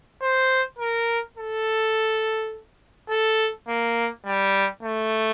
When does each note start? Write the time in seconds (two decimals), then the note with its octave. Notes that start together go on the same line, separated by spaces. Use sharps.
0.22 C5
0.79 A#4
1.37 A4
3.10 A4
3.68 A#3
4.26 G3
4.83 A3